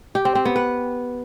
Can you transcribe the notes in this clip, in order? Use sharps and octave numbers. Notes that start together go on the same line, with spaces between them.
G4
C4
C4
B3
B4